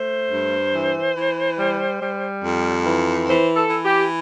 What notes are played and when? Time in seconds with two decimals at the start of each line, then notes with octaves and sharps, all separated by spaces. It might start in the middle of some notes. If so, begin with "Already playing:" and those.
Already playing: A3 C5
0.31 G2
0.74 E3
1.17 E3
1.58 G3
2.00 G3
2.43 F2
2.86 E3
3.28 E3 C5
3.56 A4
3.70 E3
3.84 G4